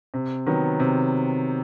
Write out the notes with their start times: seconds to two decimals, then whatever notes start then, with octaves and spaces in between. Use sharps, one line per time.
0.14 C3
0.47 D#3 F#3 B3
0.80 C3